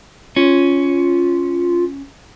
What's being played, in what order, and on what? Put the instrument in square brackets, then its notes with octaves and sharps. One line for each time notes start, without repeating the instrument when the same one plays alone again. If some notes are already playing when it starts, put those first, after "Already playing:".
[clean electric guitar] C#4 [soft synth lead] F4